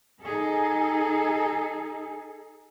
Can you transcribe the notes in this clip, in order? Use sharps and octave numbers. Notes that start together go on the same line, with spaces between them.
D#4 G#4 A4